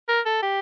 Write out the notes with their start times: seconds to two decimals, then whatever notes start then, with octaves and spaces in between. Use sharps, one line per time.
0.09 A#4
0.26 A4
0.43 G4